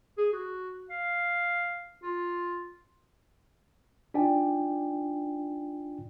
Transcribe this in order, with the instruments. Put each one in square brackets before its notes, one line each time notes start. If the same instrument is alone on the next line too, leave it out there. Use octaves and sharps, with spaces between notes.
[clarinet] G#4
F#4
F5
F4
[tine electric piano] D4 D#4 F4 D5 G5 G#5